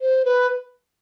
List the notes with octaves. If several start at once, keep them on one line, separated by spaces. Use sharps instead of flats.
C5
B4